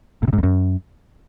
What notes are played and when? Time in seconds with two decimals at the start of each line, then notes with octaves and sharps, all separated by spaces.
0.23 A2
0.28 C3
0.33 G#2
0.38 F2
0.43 F#2